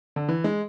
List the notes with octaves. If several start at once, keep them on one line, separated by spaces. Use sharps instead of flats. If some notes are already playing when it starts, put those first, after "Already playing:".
D3
E3
G#3